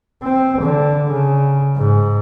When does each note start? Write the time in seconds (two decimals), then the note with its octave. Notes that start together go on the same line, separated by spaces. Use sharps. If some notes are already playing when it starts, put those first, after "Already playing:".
0.23 C4
0.62 D3
1.10 C#3
1.77 G#2